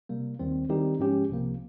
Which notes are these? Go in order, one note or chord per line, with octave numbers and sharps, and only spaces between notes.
C3 G3 A#3
D#2 D#3 G3 C4
D#3 G3 C4 D#4 G4
G#2 F3 G#3 C#4 G4
C2 C3 F3 A#3